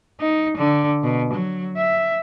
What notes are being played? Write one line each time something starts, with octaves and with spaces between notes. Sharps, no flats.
D#4
D3
B2
F#3
E5